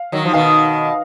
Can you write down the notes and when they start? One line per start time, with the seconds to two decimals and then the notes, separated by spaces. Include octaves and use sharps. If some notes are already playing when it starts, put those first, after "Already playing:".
Already playing: F5
0.12 D#3 F#3
0.25 F3
0.33 B2 D#3 F5